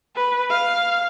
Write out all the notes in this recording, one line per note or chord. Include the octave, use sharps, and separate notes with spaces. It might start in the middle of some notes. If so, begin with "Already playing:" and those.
B4
F5